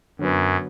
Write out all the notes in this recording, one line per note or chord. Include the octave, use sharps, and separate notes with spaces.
F#2 D3 F#3 B3